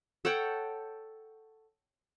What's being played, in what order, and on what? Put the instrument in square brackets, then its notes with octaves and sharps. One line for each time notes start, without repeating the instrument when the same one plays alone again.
[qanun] A4 C#5 F#5 G5